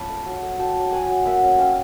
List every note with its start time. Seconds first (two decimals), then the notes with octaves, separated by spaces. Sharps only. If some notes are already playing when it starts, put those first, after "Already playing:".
Already playing: C#4 F4 A5 B5
0.10 A3
0.26 F#3
0.43 A3
0.59 F#3 G5 A5
0.76 F#3
0.86 G5
0.92 F#3 F#5 G#5
1.09 F#3
1.25 A#3 E5 F#5
1.42 C#4
1.58 C#4 F5 G5